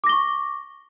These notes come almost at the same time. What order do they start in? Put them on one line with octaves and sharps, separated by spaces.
D6 A#6 G7 C#6